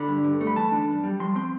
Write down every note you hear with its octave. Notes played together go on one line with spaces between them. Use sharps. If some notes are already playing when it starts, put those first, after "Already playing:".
Already playing: D3 B5
G2
G2
A3
B5
E3 A5
D4
G2
G3
F3 C6
C4 C6